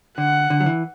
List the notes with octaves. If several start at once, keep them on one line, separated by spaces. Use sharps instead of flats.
D3 F#5
D3
F#3
E3